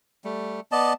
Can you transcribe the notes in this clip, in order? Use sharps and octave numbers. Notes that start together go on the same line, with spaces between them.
G3 A3
B3 D5 D#5 A5